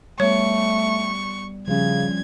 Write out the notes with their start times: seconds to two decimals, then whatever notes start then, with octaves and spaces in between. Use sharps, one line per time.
0.20 G3 A3 B3 C#5 C#6
1.68 C#3 F3 G3 C#4 G#6